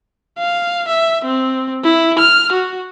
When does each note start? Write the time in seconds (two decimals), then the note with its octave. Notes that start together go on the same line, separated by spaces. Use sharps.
0.39 F5
0.88 E5
1.25 C4
1.84 E4
2.19 F6
2.52 F#4